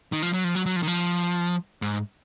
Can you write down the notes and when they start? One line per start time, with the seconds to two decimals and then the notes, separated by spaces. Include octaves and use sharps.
0.12 D#3
0.23 F3
0.33 F#3
0.44 F3
0.55 F#3
0.66 F#3
0.76 F3
0.83 D#3
0.88 F3
1.82 G#2